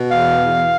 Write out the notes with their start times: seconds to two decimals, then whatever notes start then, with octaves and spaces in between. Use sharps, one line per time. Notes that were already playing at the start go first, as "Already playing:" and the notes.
Already playing: B2
0.11 E2 F5
0.41 E2